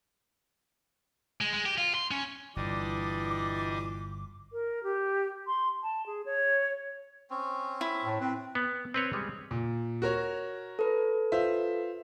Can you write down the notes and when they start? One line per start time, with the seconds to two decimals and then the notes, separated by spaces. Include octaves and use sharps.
1.41 G#3
1.53 G#3
1.65 G4
1.78 F4
1.95 C6
2.11 C#4
2.56 G1 A#2 E3 G3 D4 D#5 C6 D6
4.53 A#4
4.83 G4
5.47 C6
5.83 A5
6.06 G#4
6.26 C#5
7.30 C4 C#4
7.81 E4
8.04 A2
8.20 C4 B4
8.55 B3
8.94 C4 B4 C#5
9.13 G3 G#3
9.51 A#2
10.02 F#4 A#4 C#5
10.79 A4 B4
11.32 F4 C5 E5